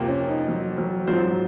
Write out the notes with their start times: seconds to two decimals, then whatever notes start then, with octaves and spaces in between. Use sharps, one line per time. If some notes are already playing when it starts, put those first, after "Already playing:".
Already playing: F2 C3 F3 A#3
0.08 C#4
0.28 D#4
0.48 F#3
0.78 F#3
1.07 G#2 F3 F#3 C4 F4 C5